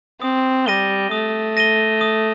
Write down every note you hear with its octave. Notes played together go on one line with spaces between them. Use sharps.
C4 D#6
G3 A#6 D#7 G7
A3 D#6
A#6 D#7 G7
D#6